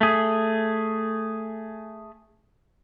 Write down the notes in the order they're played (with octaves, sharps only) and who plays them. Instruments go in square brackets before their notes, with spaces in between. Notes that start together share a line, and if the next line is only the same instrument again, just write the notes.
[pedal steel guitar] A3 G#4